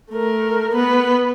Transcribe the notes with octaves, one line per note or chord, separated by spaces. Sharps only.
A3 A#4
B3 B4